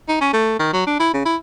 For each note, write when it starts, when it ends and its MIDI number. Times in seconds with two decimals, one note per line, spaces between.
0.09 0.18 63
0.21 0.29 61
0.33 0.59 57
0.60 0.70 51
0.73 0.83 54
0.86 0.99 62
1.00 1.14 64
1.14 1.22 49
1.25 1.36 64